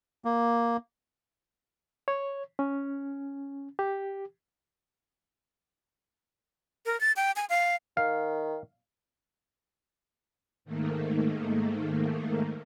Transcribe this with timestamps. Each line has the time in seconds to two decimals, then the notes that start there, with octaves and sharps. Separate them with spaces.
0.25 A#3
2.08 C#5
2.59 C#4
3.79 G4
6.86 A#4
7.01 A6
7.16 G5
7.36 G#5
7.50 F5
7.97 D#3 F5
10.65 G#2 D#3 A3 A#3